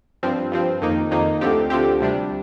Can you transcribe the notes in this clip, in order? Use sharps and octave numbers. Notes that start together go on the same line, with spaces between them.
G2 F3 C4
G2 F3 C4
F2 D#3 A#3 D#4
F2 D#3 A#3 D#4
D2 D3 F3 C4 G4
D2 D3 F3 C4 G4
D2 C3 G3 D4